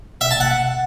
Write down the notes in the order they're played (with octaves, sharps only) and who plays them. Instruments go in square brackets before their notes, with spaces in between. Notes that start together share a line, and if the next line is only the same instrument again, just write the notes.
[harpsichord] E5
A5
F#5